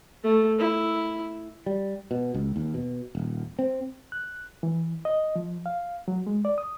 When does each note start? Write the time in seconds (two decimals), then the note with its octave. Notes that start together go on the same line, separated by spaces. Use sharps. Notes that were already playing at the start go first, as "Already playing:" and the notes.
0.23 A3
0.58 E4
1.66 G3
2.11 B2
2.34 C#2
2.56 D#2
2.74 B2
3.15 D#1
3.59 C4
4.12 F#6
4.63 E3
5.05 D#5
5.36 F3
5.66 F5
6.08 F#3
6.27 G#3
6.45 D5
6.58 D#6